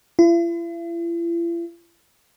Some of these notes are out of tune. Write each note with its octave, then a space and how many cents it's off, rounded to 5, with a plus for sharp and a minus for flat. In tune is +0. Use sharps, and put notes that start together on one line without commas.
E4 +45